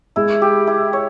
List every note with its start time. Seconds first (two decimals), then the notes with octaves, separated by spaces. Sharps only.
0.16 G#3 E4
0.42 G4
0.67 E4
0.93 C#5